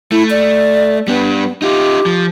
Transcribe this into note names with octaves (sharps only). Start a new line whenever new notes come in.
A3 E4
D5
G3 B3 D4
D#4 F4 G4
F3